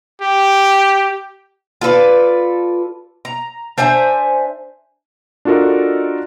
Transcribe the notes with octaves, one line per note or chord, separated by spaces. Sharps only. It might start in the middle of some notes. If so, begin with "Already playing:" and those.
G4
F4 A4 B4 D5
A#5
D4 C5 E5 G#5
D4 F4 F#4 A4 A#4 D#5